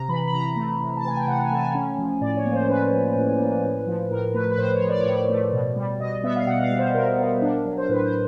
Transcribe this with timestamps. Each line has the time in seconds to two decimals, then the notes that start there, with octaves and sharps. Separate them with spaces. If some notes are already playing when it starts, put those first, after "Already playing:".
Already playing: C3 A#5
0.09 E3 B5
0.28 B5
0.33 C3 A#5
0.56 A3
0.80 C3
0.97 A5
1.03 E3 G#5
1.17 G5
1.27 C3 F#5
1.43 G#5
1.51 A3 A5
1.59 G#5
1.75 C#4
1.99 F3
2.21 A2 D5
2.37 C#5
2.46 A#3
2.53 C5
2.69 C#4 B4
2.93 F3
3.16 A2
3.40 A#3
3.64 A2
3.87 F3
4.11 A2 A#4
4.34 A3 B4
4.52 B4
4.58 A2 C5
4.74 C#5
4.82 F3
4.89 D5
5.00 C#5
5.06 A2 D5
5.29 A3
5.52 B2
5.76 G3
6.00 B2 D#5
6.24 B3 E5
6.36 F5
6.47 B2 F#5
6.63 F5
6.71 G3
6.79 C5
6.95 B2 A#4
7.19 B3
7.42 D4
7.65 F#3
7.78 C5
7.89 A2 B4
8.05 C5